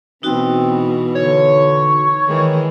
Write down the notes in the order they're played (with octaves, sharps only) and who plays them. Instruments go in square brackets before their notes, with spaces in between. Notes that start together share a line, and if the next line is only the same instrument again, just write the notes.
[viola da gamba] B2 E3 [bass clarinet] C4 [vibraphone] D#4 F#4
[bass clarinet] D3 [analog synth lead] C#5
[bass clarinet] D#3 [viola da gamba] E3 G#3